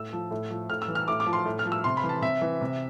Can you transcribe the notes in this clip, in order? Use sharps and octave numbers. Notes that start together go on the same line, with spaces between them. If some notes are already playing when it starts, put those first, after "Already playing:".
Already playing: A2 E6
F3
A2
F3
A2 F6
E6
E3
F6
A2 D6
D6
F3
C6
A2
F6
F3
E6
C3 C6
B5
E3
A5
C3 E5
E3
C3